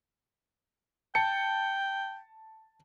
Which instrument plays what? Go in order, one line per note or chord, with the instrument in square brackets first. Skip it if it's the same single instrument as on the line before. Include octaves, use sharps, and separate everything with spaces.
[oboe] G5 [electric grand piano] A5 C#7